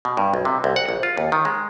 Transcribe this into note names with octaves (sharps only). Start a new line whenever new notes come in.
B2
G2
B1
C3
C2
F#5
A#1
F4
D#2
D#3
G#3